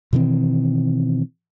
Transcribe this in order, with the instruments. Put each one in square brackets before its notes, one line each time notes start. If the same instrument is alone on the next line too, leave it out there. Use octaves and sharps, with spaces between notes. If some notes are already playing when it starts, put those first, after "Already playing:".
[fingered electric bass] B2 D#3 E3 C4